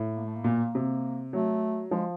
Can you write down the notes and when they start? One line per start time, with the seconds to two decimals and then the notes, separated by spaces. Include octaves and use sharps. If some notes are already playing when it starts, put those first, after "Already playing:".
Already playing: A2
0.16 A#3
0.26 A3
0.36 A#3
0.44 A#2
0.75 C3
1.33 F#3 A3
1.91 F3 G#3